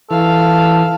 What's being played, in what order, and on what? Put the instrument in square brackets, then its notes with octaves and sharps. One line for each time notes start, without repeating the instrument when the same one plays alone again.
[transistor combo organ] E3 [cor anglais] A4 [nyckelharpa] F5